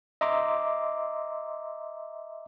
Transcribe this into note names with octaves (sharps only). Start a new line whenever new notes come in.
D#5 E5 A#5 C6 D6